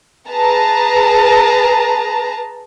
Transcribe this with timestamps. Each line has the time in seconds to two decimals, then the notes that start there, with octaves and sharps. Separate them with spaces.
0.29 G#4 B4 A5 A#5